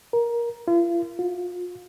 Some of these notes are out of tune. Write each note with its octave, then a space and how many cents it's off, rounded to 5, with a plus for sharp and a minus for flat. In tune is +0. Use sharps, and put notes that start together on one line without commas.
A#4 +15
F4 -40
F4 +35